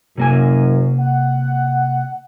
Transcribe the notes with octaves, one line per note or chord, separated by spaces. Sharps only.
F#1 F#2 C3 A#3 G#5
F#5